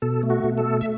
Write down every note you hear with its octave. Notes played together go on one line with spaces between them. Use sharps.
B2 A4
A3
F#4
B2
A4
A3
E5